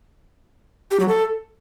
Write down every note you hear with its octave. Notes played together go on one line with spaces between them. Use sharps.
G4
F#3
A4